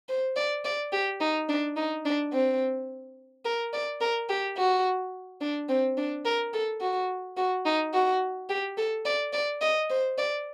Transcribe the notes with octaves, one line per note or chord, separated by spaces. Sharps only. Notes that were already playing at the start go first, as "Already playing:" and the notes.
C5
D5
D5
G4
D#4
D4
D#4
D4
C4
A#4
D5
A#4
G4
F#4
D4
C4
D4
A#4
A4
F#4
F#4
D#4
F#4
G4
A4
D5
D5
D#5
C5
D5